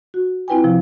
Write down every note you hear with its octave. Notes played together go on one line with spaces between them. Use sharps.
F#4
C4 E4 F4 B4 G5 G#5
C3 F3